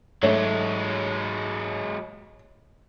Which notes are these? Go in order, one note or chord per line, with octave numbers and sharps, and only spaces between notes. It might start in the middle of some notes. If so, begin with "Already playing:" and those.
G#2 F#3 G#3 A3 G4 C#5